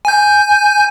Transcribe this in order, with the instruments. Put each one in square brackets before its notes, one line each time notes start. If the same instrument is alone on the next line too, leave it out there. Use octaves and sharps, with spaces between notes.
[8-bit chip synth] G#5 G6